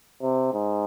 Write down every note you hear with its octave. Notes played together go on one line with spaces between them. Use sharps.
C3
G#2